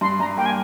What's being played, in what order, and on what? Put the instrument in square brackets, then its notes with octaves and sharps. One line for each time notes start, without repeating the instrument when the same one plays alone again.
[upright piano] G2 [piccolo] C6
[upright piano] G2 [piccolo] A#5
[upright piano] A#3 [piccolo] G5
[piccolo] G#5